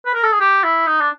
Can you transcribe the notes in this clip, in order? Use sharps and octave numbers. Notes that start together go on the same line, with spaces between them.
B4
A#4
A4
G#4
G4
E4
D#4
D4